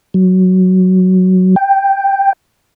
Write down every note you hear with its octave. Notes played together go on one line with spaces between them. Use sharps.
F#3
G5